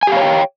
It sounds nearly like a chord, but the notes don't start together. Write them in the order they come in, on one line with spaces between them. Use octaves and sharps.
G#5 G4 F5 C#5 G5